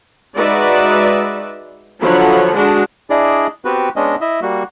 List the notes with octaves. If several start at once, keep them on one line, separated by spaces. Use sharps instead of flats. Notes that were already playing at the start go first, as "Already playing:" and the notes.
G#3 D#4 F#4 B4 D5 E5
D3 F3 F#3 C#5 F#5 B5
G#3 D4 F#4
D4 E4 G#4 D5 D#5
B3 C4 F#4 G4 B4
G#3 B3 C#4 D4 D#5
E4 D#5 E5
G3 A#3 F#4